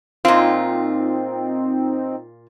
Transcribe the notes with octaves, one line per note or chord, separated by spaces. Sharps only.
A#2 C4 D#4 F4